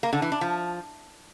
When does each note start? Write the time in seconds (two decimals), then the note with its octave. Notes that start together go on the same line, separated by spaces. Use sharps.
0.03 A#3
0.13 D3
0.22 E3
0.32 D4
0.41 F3